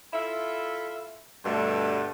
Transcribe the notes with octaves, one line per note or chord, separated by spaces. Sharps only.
E4 F4 A4 E5
G2 B2 D3 G3 A3